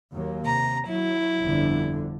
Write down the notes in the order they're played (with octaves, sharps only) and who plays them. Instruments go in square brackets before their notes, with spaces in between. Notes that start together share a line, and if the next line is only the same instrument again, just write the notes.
[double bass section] D#2 F#3 A#3
[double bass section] C3 [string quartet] A#5
[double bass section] F#3 [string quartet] E4
[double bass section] G1 F2 D3